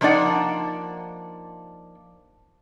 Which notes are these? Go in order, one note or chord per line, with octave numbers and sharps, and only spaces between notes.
F3 A#3 D4 D#4 D5 F#5